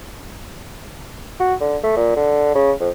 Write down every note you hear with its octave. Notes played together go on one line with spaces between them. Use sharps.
F#4
D3
A3
A#2
D3
C#3
F2